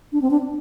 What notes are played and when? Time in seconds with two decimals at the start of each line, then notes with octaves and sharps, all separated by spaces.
0.13 D4
0.22 C4
0.31 D4